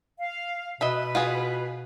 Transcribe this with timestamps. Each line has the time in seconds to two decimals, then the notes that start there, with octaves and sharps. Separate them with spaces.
0.19 F5
0.81 B2 B4 D#5 E5 B5
1.15 F4 F#4 G#4